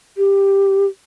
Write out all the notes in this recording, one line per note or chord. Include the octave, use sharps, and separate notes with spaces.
G4